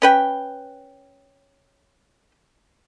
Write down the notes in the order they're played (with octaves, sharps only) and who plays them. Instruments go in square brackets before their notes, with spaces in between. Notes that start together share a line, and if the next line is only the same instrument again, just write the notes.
[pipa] C#4 B4 G5